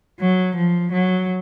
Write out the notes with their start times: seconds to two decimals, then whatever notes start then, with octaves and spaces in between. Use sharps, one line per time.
0.20 F#3
0.56 F3
0.91 F#3